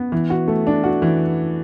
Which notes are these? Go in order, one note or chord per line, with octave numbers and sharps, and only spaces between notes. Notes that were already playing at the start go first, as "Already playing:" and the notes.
Already playing: B3
E3
F#4
A3
D4
F#4
E3